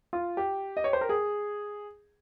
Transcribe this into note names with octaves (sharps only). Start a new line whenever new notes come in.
F4
G4
D#5
C#5
C5
A#4
G#4